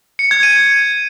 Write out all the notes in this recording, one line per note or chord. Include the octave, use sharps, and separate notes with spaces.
C#7
G#6
D#7